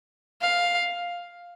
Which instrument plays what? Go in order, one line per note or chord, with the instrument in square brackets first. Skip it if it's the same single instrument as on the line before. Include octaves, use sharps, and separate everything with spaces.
[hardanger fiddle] F5